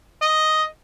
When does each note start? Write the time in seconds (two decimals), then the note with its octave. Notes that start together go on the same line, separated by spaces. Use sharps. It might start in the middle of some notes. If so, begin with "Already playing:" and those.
0.22 D#5